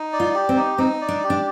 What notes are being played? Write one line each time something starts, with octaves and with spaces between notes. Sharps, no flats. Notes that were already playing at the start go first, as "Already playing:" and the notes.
Already playing: D#4
D5
F4
G4
C4
D#4
C4 D#4
D5
D4
G4
D4